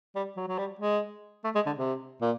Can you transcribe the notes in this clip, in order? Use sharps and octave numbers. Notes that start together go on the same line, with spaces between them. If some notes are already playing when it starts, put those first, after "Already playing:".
G3
F#3
F#3
G3
G#3
A3
G#3
D3
C3
A#2